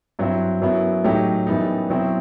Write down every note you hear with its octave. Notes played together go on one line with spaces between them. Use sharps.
G2 F#3 C4 E4
F#2 F#3 B3 E4
A2 F#3 A3 D#4 G4
F#2 E3 G3 B3 D#4
B2 F#3 C4 E4